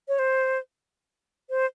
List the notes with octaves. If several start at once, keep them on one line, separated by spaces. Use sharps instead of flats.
C#5
C5
C5